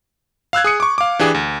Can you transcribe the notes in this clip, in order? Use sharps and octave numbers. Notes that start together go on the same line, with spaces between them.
F5 E6 F#6 G#6
G#4 D#6 C#7
C#6 D6
F5 D6
E3 D4 G4 G#4
D2